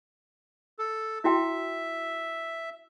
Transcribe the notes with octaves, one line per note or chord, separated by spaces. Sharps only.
A4
E4 F#4 E5 G5